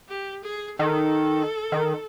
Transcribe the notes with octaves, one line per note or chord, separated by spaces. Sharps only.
G4
G#4
D#3 A4
D#3